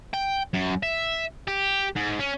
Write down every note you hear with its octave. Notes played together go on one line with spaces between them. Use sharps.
G5
F#2
E5
G4
G#2
C#4